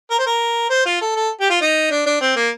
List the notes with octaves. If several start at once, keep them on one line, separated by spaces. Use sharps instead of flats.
A#4
C5
A#4
C5
F4
A4
A4
G4
F4
D#4
D4
D4
C4
A#3